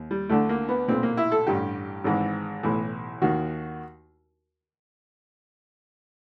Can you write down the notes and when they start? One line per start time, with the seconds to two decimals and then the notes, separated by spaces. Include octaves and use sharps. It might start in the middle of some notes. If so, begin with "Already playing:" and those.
Already playing: D#2
0.11 G3
0.29 D2 D3 A3
0.49 A#3
0.69 B3
0.88 B1 A#2 C4
1.03 A#3
1.17 E4
1.32 A4
1.46 A1 G2 D3 G4
2.04 G#1 G#2 E3
2.63 B1 A2 E3
3.22 D#2 D#3 F#4